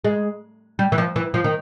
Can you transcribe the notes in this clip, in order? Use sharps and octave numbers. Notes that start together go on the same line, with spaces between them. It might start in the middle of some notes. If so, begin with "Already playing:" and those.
G#3
G3
E3
F3
E3
F3
D#3